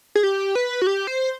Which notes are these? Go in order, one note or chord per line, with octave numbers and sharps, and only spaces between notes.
G#4
G4
B4
F#4
G4
C5